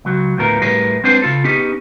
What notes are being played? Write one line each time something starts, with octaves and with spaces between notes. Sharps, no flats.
C#2 F#3
D2 A2 F3 B3 A#4
A2 G3 G#4 A#4 B4
G#3 C4 D4 B4 C5
C#3 F4 A4
B3 C#4 D#4 G4 G#4